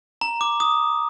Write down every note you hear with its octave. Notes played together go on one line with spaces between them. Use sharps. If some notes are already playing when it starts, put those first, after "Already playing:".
A#5
D6
D#6